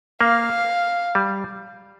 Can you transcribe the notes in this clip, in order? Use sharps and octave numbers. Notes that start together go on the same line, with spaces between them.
A#3 F5
G3